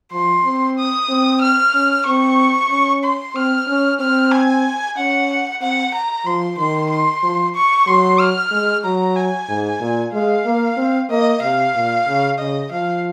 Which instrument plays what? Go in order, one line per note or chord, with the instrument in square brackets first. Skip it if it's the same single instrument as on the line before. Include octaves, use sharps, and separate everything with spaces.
[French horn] F3 [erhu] C6
[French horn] C4
[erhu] D#6
[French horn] C4
[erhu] F6
[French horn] C#4
[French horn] C4 [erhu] C#6
[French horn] C#4
[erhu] C6
[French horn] C4 [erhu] F6
[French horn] C#4
[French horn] C4 [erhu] F6
[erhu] G#5
[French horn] C#4 [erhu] F#5
[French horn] C4 [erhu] F#5
[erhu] A#5
[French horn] F3 [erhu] C6
[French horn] D#3 [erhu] C6
[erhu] C6
[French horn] F3
[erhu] C#6
[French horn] F#3 [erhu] C6
[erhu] F6
[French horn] G#3
[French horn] F#3 [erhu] A#5
[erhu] G#5
[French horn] G#2
A#2
[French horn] G#3 [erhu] F5
[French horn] A#3
C4
[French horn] A#3 [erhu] D#5
[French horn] C3 [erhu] F5
[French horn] A#2
C#3
[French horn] C#3 [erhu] D#5
[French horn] F3 [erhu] F5